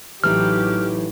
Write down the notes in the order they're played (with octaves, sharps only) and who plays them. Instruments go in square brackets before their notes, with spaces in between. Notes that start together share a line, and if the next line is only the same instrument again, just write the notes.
[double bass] A1 F#3 [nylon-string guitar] E3 A3 D#4 [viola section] G4 [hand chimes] F6